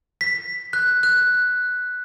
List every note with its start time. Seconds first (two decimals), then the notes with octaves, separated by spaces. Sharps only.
0.21 B6
0.73 F#6
1.03 F#6